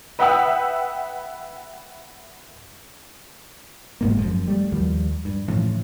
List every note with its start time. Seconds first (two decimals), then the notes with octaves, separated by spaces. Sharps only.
0.19 B4 E5 F#5 G5 D#6 E6
4.01 F#1 G#2 A#3
4.18 F#2 F3
4.48 G3 A3
4.72 D#2 F3 G3
5.25 G2
5.48 A2 C#3 E3 F3